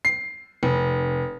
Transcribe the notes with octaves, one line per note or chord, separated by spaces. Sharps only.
C7
F1